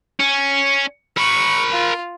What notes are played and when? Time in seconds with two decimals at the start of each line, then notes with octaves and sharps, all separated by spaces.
0.20 C#4
1.17 A#4 B5 C#6
1.72 F4